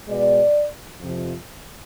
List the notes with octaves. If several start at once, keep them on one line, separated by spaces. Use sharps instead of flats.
B2 G#3 B3 D5
F2 C3 F3